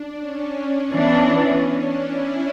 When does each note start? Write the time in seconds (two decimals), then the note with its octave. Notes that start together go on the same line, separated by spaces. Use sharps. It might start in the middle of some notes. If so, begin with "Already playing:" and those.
Already playing: D4
0.18 C#4
0.91 E3 B3 D4
1.64 D4
2.01 E4